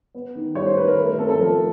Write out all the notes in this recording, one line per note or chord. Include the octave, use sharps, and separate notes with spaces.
B3
D#3
G3 C#5
C5
D#3 B4
A#4
A3
A#4
C4 A4
A4
F3 A#4